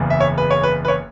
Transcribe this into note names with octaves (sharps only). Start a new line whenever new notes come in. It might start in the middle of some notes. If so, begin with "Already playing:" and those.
Already playing: F#1 E2 C#3
E5
C#5
B4
C#5
B4
B4
C#5